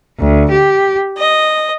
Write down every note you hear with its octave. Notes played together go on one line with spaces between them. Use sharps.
D2
G4
D#5